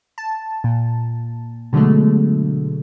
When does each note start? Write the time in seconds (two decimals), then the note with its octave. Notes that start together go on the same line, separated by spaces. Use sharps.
0.18 A5
0.64 A#2
1.73 B2 D3 F#3 G#3 A3